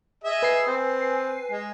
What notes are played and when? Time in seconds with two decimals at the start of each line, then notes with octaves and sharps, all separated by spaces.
0.24 G#4 D#5 E5
0.43 B4 G#5 C7
0.67 C4
1.51 G#3